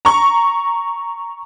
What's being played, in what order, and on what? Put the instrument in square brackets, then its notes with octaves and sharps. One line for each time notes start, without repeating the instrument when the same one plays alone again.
[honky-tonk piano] A#5 C#6